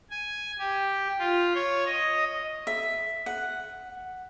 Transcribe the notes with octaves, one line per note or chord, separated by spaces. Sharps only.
G#5
G4
F4
C#5
D#5
E5
F#5